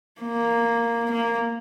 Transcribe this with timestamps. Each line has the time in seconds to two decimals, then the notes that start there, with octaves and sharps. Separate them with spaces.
0.21 A#3
1.11 A#3